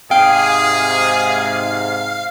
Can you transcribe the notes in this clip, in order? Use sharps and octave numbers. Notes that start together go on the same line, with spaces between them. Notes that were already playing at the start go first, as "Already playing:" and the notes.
G#2 C3 G#4 F5 G5